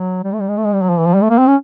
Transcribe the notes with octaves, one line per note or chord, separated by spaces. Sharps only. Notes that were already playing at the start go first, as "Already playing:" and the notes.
Already playing: F#3
G3
A3
G3
G#3
A3
G#3
G3
F#3
F3
E3
F3
G3
A3
A#3
C4
C#4